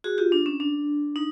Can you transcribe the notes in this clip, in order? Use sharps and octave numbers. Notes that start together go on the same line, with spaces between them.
F#4 G#4
F4 G4
D4
C#4
D4
D#4